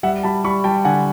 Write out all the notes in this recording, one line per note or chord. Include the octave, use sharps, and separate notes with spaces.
G3 E5 F#5
G3 A5 B5
G3 B5 C#6
G3 G5 A5
D3 F#5 G#5